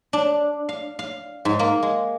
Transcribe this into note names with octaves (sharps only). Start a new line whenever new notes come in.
D4
F5
F5
G#2
A#3
G#3